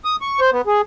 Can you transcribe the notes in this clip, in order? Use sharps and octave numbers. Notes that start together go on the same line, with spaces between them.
D#6
C#6
C5
B3
G#4